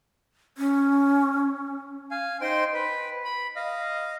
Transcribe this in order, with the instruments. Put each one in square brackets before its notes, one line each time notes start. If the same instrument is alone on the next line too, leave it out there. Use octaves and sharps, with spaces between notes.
[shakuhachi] C#4
[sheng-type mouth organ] F5 G#5
D#4 C5 G5 C6
B4
B5
D#5 F5